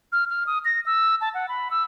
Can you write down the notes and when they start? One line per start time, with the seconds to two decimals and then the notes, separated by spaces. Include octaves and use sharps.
0.12 F6
0.30 F6
0.47 D#6
0.65 A#6
0.86 E6
1.21 A5
1.34 F#5
1.49 B5
1.71 E6